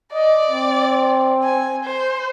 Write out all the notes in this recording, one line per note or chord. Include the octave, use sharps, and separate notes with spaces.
D5 D#5
C4
G#5
C5